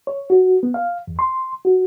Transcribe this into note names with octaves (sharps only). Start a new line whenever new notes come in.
C#5
F#4
B3
F5
E2
C6
F#4